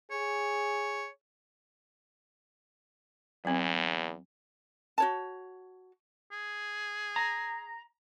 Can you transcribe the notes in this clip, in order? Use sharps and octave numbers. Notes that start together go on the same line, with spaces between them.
G#4 C#5
E2 F#3 C4
F#4 C#5 A5
G#4
A#5